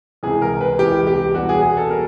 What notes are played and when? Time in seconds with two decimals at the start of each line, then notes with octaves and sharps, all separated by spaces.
0.23 C#2 C3 E3 G#4
0.41 A#4
0.61 B4
0.79 C#2 C3 E3 G4
1.07 G4
1.34 E2 B2 G3 F#4
1.49 G#4
1.62 G#4
1.77 A4
1.90 B2 G3 A#4